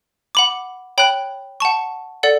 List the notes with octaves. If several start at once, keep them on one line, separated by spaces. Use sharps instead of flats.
F#5 B5 D6
C#5 G5 B5 F#6
F#5 A5 C#6
A4 D5 F#5